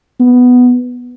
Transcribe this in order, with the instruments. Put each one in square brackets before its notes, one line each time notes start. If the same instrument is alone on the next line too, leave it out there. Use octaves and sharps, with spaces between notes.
[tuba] B3